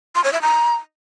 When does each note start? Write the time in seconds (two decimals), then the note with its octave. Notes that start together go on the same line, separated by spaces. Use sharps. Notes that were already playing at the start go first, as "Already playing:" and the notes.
0.15 C6
0.24 C#5
0.33 E5
0.42 A#5